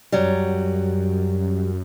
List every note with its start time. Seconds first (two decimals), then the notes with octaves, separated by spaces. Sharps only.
0.12 F#2 F#3 G3